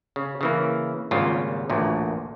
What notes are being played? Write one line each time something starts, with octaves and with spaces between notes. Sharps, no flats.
C#3
C#3 E3 A#3
G#1 A#2 C#3 G3 F4
A1 D2 A#2